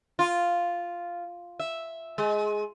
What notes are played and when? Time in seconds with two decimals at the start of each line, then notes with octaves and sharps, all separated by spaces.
0.19 F4
1.59 E5
2.18 G#3